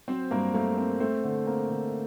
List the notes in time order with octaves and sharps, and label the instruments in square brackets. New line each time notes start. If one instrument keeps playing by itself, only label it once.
[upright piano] F#3 C4 C5
G2 A#3 A#4
A3 A#3 A#4
C4
A3 C4 C5
D3
A#3 C4 A#4
D3